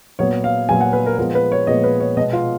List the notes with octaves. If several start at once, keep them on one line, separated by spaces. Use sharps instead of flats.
A#2 F#3 B3 C#5
F5
A#2 F#3 B3 G#5
F#5
B4
A#4
A#2 F3 G#3 B3 A#4
B4
C#5
A#2 F3 G#3 B3 D#5
B4
C#5
B2 G#3 B3 D#5
F4